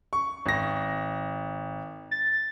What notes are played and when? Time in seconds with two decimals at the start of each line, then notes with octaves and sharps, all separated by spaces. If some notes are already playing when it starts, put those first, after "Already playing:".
0.13 C#6
0.46 G#1 A#6
2.11 A6